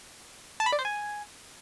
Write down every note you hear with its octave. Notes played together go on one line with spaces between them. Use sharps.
A5
B5
D5
C5
G#5